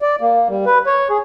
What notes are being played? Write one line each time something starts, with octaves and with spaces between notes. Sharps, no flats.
D5
A#3
G3
B4
C#5
G#4